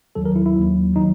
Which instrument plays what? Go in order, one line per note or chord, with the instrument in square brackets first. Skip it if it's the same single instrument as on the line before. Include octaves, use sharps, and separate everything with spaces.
[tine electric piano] D#2 D#3 F#3 A4
A#4
E4
E4
D#2 D#3 F#3
D#3 F#3 D#4